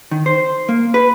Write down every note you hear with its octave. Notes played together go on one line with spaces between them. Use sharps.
D#3
C5
A#3
B4